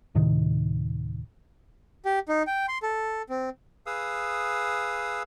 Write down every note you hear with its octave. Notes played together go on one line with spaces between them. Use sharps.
D1 A2 C3 D#3
G4
D#4
G5
C6
A4
C4
G#4 B4 F5 D#6 E6